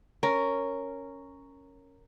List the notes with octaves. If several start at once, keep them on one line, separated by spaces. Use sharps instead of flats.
C#4 A#4